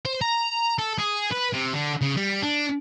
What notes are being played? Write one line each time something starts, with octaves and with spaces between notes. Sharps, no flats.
C5
A#5
A4
G#4
B4
C3
D3
C#3
G3
D4